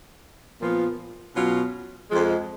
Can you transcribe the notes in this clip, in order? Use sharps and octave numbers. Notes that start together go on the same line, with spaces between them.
A#2 F3 B3 F4
B2 F#3 C#4 F4
F2 F3 G#3